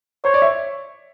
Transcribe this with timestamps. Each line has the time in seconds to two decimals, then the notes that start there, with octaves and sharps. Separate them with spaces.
0.24 C5 C#5
0.34 D5
0.42 E5